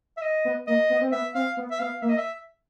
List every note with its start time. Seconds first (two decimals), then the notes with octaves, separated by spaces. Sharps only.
0.17 E5
0.22 D#5
0.45 B3
0.67 A#3 D#5
0.90 B3
1.01 C4
1.12 B3 E5
1.35 C4 F5
1.57 B3
1.71 E5
1.80 B3 F5
2.02 A#3 E5
2.09 D#5
2.18 E5